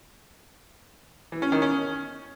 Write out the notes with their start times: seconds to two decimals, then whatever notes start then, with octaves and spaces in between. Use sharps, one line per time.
1.32 E3
1.42 C#4
1.52 D#3
1.62 C#4